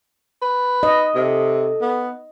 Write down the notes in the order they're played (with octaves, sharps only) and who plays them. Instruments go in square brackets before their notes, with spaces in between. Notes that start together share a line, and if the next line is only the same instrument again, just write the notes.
[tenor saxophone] B4
[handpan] D#5
[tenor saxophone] C3 [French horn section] A4
[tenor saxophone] B3